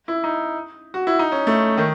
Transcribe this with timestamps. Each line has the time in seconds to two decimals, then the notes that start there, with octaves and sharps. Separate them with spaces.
0.08 E4
0.24 D#4
0.94 F#4
1.07 E4
1.19 D#4
1.32 C#4
1.47 A3
1.78 D#3